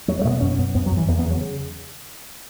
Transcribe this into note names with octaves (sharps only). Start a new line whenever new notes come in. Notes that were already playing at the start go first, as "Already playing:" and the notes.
E2 F#3
F#3
B2 A3
B3
F#2 C#4
C#4
F#2 B3
F#2 B3
F#3
F#2
E3
E2 B3
B3
C#3
F#3
C#3